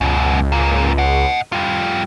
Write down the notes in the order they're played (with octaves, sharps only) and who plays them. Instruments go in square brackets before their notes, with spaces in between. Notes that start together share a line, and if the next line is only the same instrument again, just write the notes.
[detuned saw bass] C#2 [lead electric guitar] F#2 B2
[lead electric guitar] G#2 A#3
D#5 F#5
G3 F4